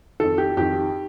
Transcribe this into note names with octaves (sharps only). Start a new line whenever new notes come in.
F2 D#3 A4
G4
F2 D#3 G4